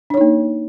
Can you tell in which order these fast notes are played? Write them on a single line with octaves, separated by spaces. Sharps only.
D4 C#5 D#4 A#3